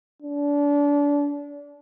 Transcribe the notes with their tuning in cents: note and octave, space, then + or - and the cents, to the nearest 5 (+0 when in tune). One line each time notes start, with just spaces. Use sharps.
D4 -30